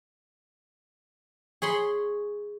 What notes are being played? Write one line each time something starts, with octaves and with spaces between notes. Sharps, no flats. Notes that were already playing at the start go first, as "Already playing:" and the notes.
G#4 C#5 B5 C6